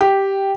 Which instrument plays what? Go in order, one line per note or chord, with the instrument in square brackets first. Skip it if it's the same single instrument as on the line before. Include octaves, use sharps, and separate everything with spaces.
[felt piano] G4